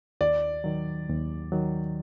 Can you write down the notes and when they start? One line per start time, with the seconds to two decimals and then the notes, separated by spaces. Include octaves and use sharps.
0.21 D#2 D5
0.64 D#3 F#3
1.09 D#2
1.52 D#3 F#3